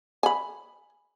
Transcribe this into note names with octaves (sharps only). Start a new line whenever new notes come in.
G#5 B5